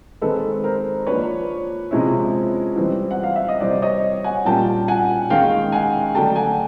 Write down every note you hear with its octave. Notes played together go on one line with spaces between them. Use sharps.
D#3 G#3 C4 A4 B4
A#4 C5
F3 A#3 D4 B4 C#5
C3 F3 G#3 C#4 E4
E3 G3 C4
F#5
F5
E5
D#5
C3 E3 G3 C5 D5
C#5 D#5
F#5 G#5
A#2 G3 A#3 C#4 F4 G5 A5
F#5 G#5
D#3 G#3 C#4 F5 G5
F#5 G#5
D3 F#3 A3 D4 G5 A5
F#5 G#5